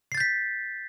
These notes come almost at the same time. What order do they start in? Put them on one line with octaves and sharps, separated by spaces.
C7 A6 G6 B6